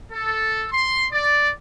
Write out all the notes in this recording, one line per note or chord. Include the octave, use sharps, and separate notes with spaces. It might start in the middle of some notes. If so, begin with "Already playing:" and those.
A4
C6
D5